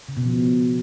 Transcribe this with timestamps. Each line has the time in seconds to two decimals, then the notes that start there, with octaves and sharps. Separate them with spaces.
0.09 C#3
0.17 B2
0.25 F3